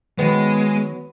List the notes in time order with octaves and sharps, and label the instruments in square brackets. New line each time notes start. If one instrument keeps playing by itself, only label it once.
[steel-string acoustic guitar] D#3 F#3 [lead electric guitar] G#3 [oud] B3